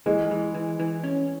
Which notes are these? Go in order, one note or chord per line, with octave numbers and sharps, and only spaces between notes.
E3 G#3
E3
E3
E3
C#4